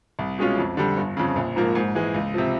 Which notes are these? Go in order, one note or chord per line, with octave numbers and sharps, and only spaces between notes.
C2
B2 G#3 C#4 F4
F2
D3 G3
G1
F2 C#3
A#1
G#2 F3 A#3
G#2
E3 G#3
C#2
C3 F3